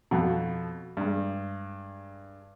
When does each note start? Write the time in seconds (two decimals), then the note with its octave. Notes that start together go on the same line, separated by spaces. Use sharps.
0.11 F2 B2
0.97 G2 G#3